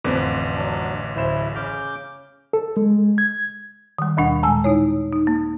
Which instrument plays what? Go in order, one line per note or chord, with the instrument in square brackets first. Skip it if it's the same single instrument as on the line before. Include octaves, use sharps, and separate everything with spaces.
[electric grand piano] A1 D3 B4 [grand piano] F2 C5 D6
[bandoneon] F#3 D4
[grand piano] D1 C5 E7 [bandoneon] E4
[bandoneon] C#3 D6 G6 [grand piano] F6
[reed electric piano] A4
G#3
G#6
[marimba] D#3 G3
D#2 B2 D4 F#5
A#2 G#3 G#5 A5 E6
D#4 E4 C#5
D#4
A#3